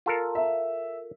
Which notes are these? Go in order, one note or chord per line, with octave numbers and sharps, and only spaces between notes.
F4 A4 A#4
E5